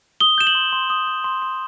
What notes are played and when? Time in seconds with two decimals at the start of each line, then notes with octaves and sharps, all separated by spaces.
0.20 D#6 G7
0.38 G6 E7
0.47 F#7
0.55 C6
0.73 C6
0.90 D#6
1.07 G6
1.24 C6
1.42 C6